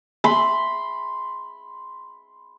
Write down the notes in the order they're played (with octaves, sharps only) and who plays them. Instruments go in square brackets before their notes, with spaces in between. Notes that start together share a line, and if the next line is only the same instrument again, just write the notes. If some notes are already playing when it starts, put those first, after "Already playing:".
[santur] B5 C6